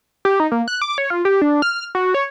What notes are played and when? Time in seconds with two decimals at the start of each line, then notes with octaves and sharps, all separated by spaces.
0.25 G4
0.40 D#4
0.52 A#3
0.68 F#6
0.82 D6
0.98 C#5
1.10 F4
1.25 G4
1.42 D4
1.62 F6
1.95 F#4
2.14 C#5